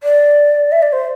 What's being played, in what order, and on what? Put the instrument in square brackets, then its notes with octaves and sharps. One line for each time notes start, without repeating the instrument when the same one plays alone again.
[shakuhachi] D5
E5
D5
C5